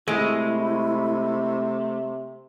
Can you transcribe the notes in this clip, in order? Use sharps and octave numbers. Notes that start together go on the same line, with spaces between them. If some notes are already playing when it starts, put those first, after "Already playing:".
C3 G#3 A3 E4